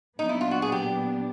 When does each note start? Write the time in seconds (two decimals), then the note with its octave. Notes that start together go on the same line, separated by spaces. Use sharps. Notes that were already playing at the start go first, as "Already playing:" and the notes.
0.19 A#2 F#3 B3 D4 D#4
0.29 E4
0.41 F4
0.51 F#4
0.62 G#4
0.72 G4